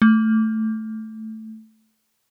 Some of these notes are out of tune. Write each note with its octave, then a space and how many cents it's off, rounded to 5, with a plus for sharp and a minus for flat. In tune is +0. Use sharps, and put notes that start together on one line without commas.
A3 +0